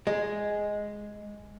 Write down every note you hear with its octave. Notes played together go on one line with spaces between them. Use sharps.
G#3